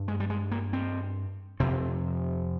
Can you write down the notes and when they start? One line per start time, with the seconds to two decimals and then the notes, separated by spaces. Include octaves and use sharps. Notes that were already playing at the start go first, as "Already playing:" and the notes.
Already playing: G2
0.08 G#3
0.20 G3
0.30 G#3
0.51 A#3
0.73 C4
1.60 F2 C3 C4